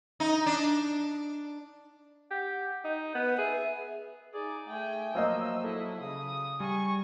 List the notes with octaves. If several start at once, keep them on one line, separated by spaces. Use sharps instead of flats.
D#4
D4
G4 F#5
D#4
B3 B4
G#4 E5
D#4 G#4 D5
A3 G5 G#5
F3 F#3 A#3 D#5 E6
E4 A4 D#5
C#3 D#6
G3 G#5 C#6